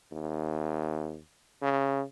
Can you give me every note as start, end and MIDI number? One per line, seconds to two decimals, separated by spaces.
0.12 1.19 39
1.62 2.03 49